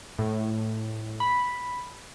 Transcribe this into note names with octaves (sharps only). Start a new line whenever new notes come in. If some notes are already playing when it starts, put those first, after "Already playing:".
A2
B5